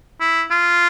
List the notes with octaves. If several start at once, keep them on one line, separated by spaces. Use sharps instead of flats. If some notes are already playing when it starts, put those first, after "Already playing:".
E4
F4